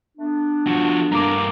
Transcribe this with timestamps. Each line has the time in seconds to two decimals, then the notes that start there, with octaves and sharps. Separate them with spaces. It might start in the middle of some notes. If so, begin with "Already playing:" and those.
0.18 A3 B3 D4
0.67 F3 F#4
1.12 G2 A#3 A#5 D6